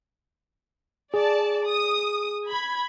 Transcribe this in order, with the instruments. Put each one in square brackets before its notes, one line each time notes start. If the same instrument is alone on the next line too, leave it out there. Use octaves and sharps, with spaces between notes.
[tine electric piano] G#4 [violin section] D5 A5
[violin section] D#6
B5 G#6